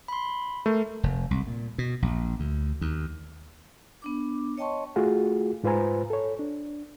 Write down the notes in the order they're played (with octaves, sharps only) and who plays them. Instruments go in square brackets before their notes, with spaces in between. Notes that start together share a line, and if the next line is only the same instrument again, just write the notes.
[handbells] B5 C6
[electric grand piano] A3 [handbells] A#4
[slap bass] F1
C2
A#2
B2
A#1
D2
D#2
[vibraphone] B3 D4 D6
C#5 D#5 G5 A5 C6 C#6
[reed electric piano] A3 F4 F#4 G#4
G#2 F4 B4 C5 G#5 A#5
A4 C#5
D4